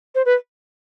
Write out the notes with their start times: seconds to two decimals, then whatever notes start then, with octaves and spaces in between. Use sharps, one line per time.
0.15 C5
0.25 B4